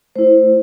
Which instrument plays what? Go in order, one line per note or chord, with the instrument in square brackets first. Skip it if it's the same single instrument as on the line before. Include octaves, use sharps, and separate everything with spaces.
[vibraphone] A3 E4 C5